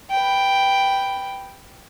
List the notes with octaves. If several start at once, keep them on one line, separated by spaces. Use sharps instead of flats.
B4 G5